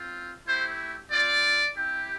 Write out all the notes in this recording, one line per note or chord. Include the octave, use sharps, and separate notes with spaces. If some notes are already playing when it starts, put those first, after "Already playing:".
Already playing: C4 F4
A3 E4 G4 C5
C4 F4 D5
C4 E4 G4